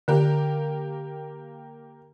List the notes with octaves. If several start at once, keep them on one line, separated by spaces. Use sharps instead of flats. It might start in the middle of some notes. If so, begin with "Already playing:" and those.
D3 A#3 G4 A#4